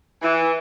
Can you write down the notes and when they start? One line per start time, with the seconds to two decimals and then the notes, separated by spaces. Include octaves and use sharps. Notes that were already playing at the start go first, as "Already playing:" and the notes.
0.22 E3